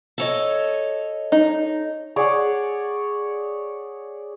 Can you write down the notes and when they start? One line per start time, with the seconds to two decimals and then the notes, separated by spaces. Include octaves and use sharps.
0.18 A4 C#5 D#5
1.32 D#4
2.16 G#4 C#5 D5 F#5